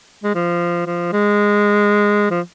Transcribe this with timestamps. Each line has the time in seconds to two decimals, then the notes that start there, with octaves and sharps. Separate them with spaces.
0.24 G#3
0.35 F3
0.86 F3
1.12 G#3
2.31 F3